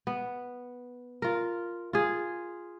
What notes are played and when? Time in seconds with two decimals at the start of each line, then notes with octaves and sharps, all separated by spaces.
0.07 B3
1.22 F4 A#4
1.93 F4 G#4